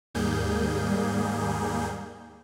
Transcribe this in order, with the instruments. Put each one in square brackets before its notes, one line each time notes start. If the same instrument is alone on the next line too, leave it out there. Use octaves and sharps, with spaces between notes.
[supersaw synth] D#2 G#2 G3 A#3 G#4 G6